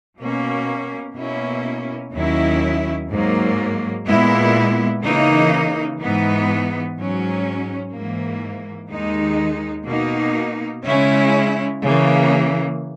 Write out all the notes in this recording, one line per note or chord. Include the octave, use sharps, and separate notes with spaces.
B2 A#3 C#4
B2 A#3 C#4 E4
D#2 D#3 F#3 C#4 E4
G#2 F#3 A#3
A#2 G#3 B3 E4
C#3 E3 A#3 D#4
G#2 E3 B3 D#4
G#2 F#3 C#4
G#2 E3 A#3
D#2 D#3 G#3 D#4
B2 A#3 D#4
C#3 G#3 C#4 E4
C#3 E3 A#3